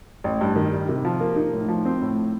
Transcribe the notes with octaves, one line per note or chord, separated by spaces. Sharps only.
A1
G2
D#3
G3
C3
F3
A#3
D#4
A2
F3
C4
A2